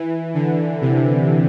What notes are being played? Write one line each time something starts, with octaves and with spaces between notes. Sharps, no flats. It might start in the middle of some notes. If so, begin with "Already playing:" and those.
Already playing: E3
D3
C3